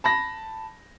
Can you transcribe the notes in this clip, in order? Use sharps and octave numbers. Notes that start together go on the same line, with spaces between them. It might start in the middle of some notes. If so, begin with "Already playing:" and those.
A5 B5 A#6